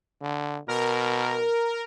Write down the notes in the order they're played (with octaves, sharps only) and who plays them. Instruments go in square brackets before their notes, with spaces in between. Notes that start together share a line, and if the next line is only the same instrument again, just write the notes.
[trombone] D3
[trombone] B2 [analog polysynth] A#4